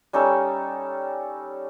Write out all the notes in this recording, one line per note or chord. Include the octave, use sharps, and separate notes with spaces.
G3 C#4 D#4 A4